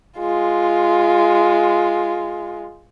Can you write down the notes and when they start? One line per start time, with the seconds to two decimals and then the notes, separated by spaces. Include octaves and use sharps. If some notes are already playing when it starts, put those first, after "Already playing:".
0.18 G#3 F4